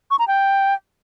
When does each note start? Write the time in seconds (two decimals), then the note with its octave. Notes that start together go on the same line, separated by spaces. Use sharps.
0.11 C#6
0.19 A#5
0.28 G5